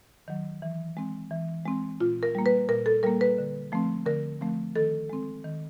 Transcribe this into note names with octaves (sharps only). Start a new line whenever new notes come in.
D#3 F#3
E3
G#3 C4
E3
G#3 C4
A#2 F4
A#4
G3 A#3
B4
A#2 A#4
A4
G3 A#3 A#4
B4
D3
F3 A3 C4
D3 A#4
F3 A3 C4
D#3 A4
G#3 C4
D#3